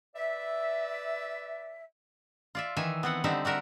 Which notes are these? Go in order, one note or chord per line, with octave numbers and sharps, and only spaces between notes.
B4 D5 E5
F4 D5 E5
D#3 E3 E5 G#5
B3 C4 F#5
D3 G3 C4 D#4 E5
G3 F#4 A#4 E5